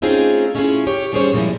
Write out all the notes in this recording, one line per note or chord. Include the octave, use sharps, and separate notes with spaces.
A3 C4 C#4 D#4 F4 G#4
A3 C#4 D4 E4 F4 G#4
G4 C#5
D#3 G3 C#4 G#4 C5 C#5
A#2 F3 G3 G#3 E4